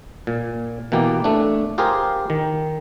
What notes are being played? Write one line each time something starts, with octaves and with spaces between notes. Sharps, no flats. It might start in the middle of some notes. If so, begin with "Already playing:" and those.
A#2
B2 E3 A#3 G4
A3 D4
F4 G4 G#4 A#4 C5
D#3